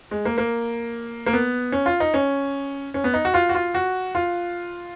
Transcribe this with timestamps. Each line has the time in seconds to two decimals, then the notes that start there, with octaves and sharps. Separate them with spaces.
0.11 G#3
0.25 A#3
0.38 A#3
1.26 A#3
1.33 B3
1.72 C#4
1.86 F4
2.00 D#4
2.14 C#4
2.94 C#4
3.04 B3
3.14 D#4
3.25 F#4
3.34 F4
3.49 F#4
3.55 F4
3.75 F#4
4.15 F4